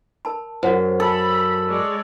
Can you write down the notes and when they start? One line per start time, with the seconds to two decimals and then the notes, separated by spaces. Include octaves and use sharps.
0.25 A#4 A5 B5
0.63 F#2 C5
1.00 A4 B5
1.68 G#3 C#5 D5